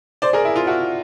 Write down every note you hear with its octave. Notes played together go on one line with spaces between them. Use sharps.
C5 D5
G#4 A#4
E4
F4
E4 F#4